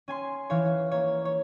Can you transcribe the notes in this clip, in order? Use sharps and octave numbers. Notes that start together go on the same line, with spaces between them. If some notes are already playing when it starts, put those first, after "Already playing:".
C#4 G#5 C6
E3 C#5 F5
A#3 C#5
C#5